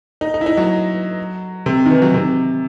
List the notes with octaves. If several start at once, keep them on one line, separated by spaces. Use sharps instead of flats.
D#4
D#4
E4
D#4
F#3
C3
D#3
E3
F#3
C3